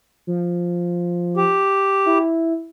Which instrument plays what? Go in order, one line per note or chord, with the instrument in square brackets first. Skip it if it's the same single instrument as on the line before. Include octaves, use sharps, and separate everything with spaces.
[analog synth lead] F3
[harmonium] G4
[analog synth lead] E4